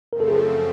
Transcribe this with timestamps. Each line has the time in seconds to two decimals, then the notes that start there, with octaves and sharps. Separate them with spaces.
0.12 F#2 C#3 F3 A3 C4 A#4
0.20 A4
0.28 G#4
0.36 A4